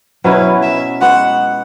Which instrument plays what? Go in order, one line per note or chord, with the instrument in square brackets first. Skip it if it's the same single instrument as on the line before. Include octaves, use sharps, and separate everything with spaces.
[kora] B2 F#3 C#4 E4 [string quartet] B4
[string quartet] E5
[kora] G#3 B3 F#4 [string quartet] F#5